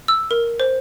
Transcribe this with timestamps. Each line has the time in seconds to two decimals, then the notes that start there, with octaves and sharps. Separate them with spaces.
0.08 E6
0.31 A#4
0.60 C5